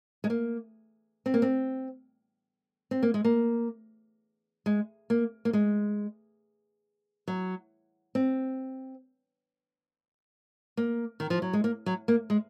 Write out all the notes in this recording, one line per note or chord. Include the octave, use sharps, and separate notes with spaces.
G#3
A#3
C4
A#3
C4
C4
A#3
G#3
A#3
G#3
A#3
A#3
G#3
F#3
C4
A#3
D#3
F3
F#3
G#3
A#3
F#3
A#3
G#3